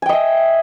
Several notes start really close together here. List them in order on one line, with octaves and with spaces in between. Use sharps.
G#5 G5 D#5 E5